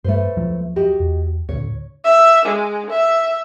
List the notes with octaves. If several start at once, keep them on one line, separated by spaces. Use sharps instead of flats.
G2 A3 B4 C5
D2 F3 F#3
F#4 G4 D#5
E2
D2 A2 D3 C#5
E5
G#3
E5